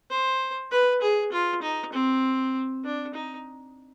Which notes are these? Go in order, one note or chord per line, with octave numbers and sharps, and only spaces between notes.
C5
B4
G#4
F4
D#4
C4
D4
D#4